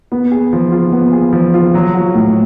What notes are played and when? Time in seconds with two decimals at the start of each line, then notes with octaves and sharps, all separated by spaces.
0.12 B3
0.32 G#4
0.53 F3
0.72 F4
0.92 B3
1.13 G#4
1.33 F3
1.54 F4
1.74 F#3
1.94 F#4
2.15 A2